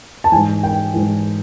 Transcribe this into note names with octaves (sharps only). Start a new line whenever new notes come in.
A5
G#2 E3 G#5
G5
G#2 E3